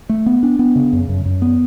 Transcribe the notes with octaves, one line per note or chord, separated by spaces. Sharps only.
A3
B3
D4
B3
C#3
F#2
F#2
F#2
B3